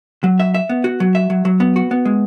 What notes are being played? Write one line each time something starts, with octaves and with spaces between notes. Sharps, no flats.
F#3
E5
E5
B3
F#4
F#3
E5
F#3
F#3
B3
F#4
B3
G#3